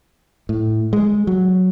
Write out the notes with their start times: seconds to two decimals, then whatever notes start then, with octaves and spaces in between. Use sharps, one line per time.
0.49 A2
0.93 G#3
1.27 F#3